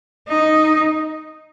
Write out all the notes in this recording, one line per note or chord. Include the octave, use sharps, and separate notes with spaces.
D#4